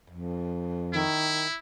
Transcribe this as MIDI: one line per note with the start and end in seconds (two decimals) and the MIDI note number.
0.10 1.04 41
0.93 1.47 51
0.93 1.57 64